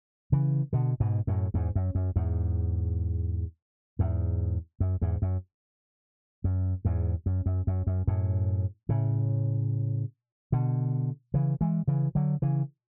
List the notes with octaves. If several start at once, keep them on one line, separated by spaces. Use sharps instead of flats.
C#3 E3
B2 D3
G#2 B2
F#2 A2
E2 G#2
F#2
F#2
E2 G#2
E2 G#2
F#2
E2 G#2
F#2
F#2
E2 G#2
F#2
F#2
F#2
F#2
F#2 A2
A2 C#3
B2 D3
C#3 E3
E3 G#3
C#3 E3
D3 F#3
C#3 E3